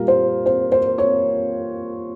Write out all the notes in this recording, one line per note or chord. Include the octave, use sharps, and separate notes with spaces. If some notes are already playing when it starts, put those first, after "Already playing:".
Already playing: A#2 G3 A#3 A#4
C5
C5
C5
C#5